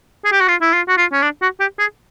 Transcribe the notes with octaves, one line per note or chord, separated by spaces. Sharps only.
G#4
G4
F#4
F4
E4
F4
F#4
F4
C#4
D4
F#4
G4
G#4